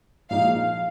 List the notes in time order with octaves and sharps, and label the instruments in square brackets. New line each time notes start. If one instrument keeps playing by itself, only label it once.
[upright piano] A#2 F3 G#3 D#4 [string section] F5